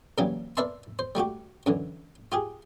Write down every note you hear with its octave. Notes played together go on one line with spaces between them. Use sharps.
A#2 C#3 E3 F#3 G3 A#3
A#4 B4 D5 E5 A5 C6
C5
G3 A3 F#4 G4
F#2 D3 E3
F4 G4 G#4